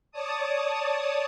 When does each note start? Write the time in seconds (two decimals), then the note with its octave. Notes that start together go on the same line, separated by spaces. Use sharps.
0.11 C#5 D5 A5 D#6